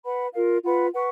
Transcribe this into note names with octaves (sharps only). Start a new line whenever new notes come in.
B4 F#5 B5
F4 A#4 F5
F4 B4 F#5 B5
B4 F#5 C#6